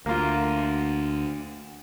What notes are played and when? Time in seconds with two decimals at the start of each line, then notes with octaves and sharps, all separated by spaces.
0.06 D2 A#3 F4